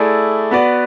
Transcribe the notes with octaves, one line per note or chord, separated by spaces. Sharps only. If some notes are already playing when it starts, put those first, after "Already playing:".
Already playing: A3 E4 G#4 D5
B3 F#4 B4 D5